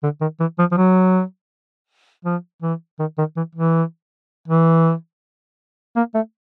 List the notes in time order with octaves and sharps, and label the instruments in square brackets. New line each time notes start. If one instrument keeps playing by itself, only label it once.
[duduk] D3
D#3
E3
F3
F3
F#3
F3
E3
D#3
D#3
E3
E3
E3
A#3
A3